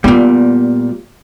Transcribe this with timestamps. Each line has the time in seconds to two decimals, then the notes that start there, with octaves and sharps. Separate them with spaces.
0.04 A#2 G3 B3